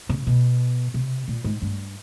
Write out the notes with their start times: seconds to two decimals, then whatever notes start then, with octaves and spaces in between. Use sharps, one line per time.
0.09 C#3
0.27 B2
0.94 C3
1.28 A#2
1.44 G#2
1.62 G2